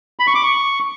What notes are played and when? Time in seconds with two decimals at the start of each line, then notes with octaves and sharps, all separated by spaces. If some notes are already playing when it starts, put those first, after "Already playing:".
0.19 B5
0.27 C#6
0.35 D6
0.43 C#6